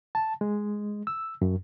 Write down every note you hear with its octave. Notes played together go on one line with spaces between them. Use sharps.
A5
G#3
E6
F#2